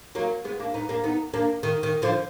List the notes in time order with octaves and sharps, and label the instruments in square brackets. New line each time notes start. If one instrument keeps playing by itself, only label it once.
[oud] F#3 A#3
G#3 B3
A#3 D4
B3 D#4
A#3 D4
B3 D#4
A#3 D4
D#3
D#3
D3 F3